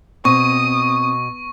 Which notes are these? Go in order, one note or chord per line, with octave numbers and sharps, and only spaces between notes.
B2 C4 C#6 D#6